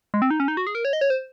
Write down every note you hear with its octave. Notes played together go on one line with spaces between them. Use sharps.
G#3
C4
D#4
C#4
D#4
F#4
G#4
A#4
C#5
D#5
C#5
C5